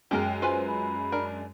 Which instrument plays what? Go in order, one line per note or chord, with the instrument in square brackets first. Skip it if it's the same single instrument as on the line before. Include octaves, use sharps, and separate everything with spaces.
[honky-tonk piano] F#2 G#3 [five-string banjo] G4 A#4 [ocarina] G5
[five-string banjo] F4 B4 G#5 [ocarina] C5
[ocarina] B5
[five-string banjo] D4 A#4